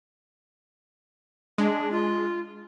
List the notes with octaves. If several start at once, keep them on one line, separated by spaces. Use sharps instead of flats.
G#3 D4
F4